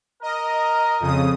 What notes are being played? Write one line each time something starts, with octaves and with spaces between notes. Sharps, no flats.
A#4 D#5
F2 C#3 D#6